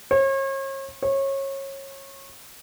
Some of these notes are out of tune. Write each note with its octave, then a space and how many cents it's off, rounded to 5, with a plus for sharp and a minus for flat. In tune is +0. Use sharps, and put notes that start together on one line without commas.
C#5 -40
C#5 -25